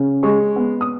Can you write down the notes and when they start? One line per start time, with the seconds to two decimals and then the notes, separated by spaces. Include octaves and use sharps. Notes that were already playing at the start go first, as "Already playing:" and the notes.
Already playing: C#3
0.23 G#3 C#6
0.56 B3
0.81 D#6